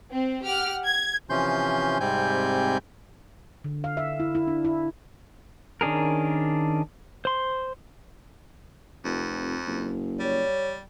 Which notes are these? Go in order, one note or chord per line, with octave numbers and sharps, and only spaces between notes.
C4
G4 F#5 F6
G#6
C3 E3 F3 C#4 C6 G6
G#2 C3 G3 C4 G#5 G6
D3
F5
E5
E4
E4
D4
E4
D#3 C#4 D4 G#4 A#4
C5 C6
F1 F2
F#1
G3 C#5